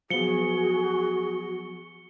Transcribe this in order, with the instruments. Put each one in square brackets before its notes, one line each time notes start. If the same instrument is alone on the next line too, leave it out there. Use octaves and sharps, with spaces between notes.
[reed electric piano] F3 F#3 B3 [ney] F#4 [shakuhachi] G#4 [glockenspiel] C#7 G7